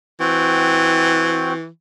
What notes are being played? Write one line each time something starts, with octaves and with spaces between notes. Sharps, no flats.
E3 C4 F#4 G5